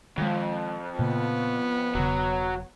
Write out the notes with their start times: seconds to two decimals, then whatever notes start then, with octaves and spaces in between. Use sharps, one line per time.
0.18 F2 D#3 G#3
0.99 A#2 C#3 A#3 B3
1.95 E1 C#3 F#3